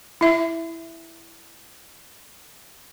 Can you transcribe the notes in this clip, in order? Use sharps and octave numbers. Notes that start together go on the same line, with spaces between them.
E4 E5